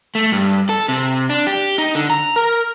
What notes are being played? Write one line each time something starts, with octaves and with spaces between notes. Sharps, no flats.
A3
G2
A4
C3
D4
G4
D#4
D3
A#5
A#4